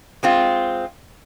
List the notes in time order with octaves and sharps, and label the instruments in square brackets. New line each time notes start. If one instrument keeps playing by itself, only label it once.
[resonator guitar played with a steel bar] G#3 C4 F4